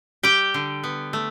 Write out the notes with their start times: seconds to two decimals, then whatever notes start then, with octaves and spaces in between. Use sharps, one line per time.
0.23 G3 G4 G5
0.54 D3
0.84 B3
1.13 A3